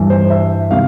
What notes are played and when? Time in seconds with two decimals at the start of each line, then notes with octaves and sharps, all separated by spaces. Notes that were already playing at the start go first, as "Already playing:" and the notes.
Already playing: G2 E3 G3
0.10 C5
0.30 E5
0.70 C3 D#3 F5